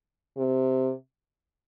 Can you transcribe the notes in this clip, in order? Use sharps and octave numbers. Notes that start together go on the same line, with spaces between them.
C3